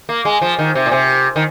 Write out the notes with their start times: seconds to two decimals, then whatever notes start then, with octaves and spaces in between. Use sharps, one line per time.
0.09 A#3
0.25 G#3
0.42 F3
0.59 D#3
0.75 C3
0.86 A#2
0.91 C3
1.36 D#3